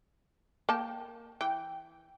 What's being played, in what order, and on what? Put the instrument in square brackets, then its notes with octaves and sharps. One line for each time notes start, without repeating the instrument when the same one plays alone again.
[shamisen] A#3 A5 [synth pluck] G5
[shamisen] E3 [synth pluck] G5